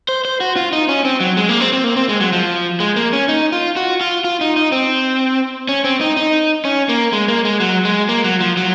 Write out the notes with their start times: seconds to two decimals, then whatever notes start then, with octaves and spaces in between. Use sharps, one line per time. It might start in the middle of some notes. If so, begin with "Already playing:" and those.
0.09 C5
0.25 C5
0.41 F#4
0.56 F4
0.73 D#4
0.89 C#4
1.05 C4
1.20 F#3
1.37 G#3
1.49 A#3
1.61 C4
1.73 C4
1.84 A#3
1.96 C4
2.09 G#3
2.20 F#3
2.33 F3
2.80 G#3
2.96 A#3
3.13 C#4
3.29 D#4
3.52 F4
3.76 F#4
4.01 F4
4.24 F4
4.41 D#4
4.56 D#4
4.72 C4
5.69 C#4
5.84 C4
6.01 D#4
6.17 D#4
6.65 C#4
6.89 A#3
7.13 G#3
7.28 A#3
7.45 G#3
7.60 F#3
7.85 G#3
8.09 A#3
8.24 F#3
8.41 F3
8.57 F#3